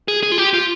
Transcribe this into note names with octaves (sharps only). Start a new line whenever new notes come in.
G#4
G#4
F4
G4
F4